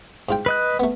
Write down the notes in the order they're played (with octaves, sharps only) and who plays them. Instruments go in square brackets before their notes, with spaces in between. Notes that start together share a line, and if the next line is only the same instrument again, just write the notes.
[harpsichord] G#2 F4 G5
[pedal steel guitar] B4 D#5 F#6
[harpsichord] A3 B3